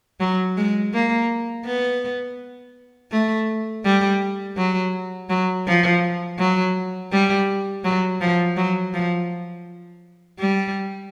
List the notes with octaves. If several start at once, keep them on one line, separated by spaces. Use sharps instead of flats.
F#3
G#3
A#3
B3
A3
G3
F#3
F#3
F3
F#3
G3
F#3
F3
F#3
F3
G3